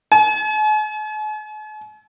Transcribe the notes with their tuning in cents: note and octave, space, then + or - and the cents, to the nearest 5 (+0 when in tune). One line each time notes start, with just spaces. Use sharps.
G#5 +45